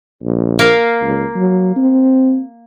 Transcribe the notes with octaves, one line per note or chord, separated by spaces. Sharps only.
A#1
A#3 F5
C#2
F#3
C4